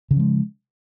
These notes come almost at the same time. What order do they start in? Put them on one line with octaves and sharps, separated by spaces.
C#3 C#4 F3 G#3